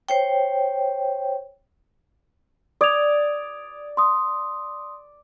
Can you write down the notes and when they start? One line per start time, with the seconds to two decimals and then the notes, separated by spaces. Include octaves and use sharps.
0.09 C5 C#5 G5
2.81 D5 D#6 G#6 F7
3.97 C6 D#6